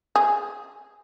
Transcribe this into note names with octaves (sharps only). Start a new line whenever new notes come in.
G#4